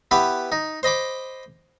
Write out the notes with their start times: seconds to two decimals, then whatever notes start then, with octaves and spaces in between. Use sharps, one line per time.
0.11 B3 E4 G4 B4
0.52 D#4
0.83 C5 D#5 B5 D6